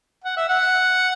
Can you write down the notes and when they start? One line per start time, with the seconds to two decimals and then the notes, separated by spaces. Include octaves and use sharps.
0.24 F#5
0.37 E5
0.49 F#5